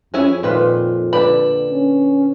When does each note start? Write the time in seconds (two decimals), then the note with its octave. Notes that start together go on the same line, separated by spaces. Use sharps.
0.14 F2 C#4 E4 G#4
0.43 A#2 D#3 F4 B4
1.13 D3 B4 D5 G5 B5
1.70 C#4